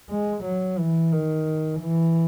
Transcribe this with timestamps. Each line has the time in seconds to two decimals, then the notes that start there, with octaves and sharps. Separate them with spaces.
0.10 G#3
0.44 F#3
0.78 E3
1.12 D#3
1.81 E3